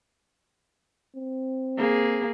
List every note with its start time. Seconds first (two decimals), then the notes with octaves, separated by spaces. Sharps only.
1.16 C4
1.77 A#3 G#4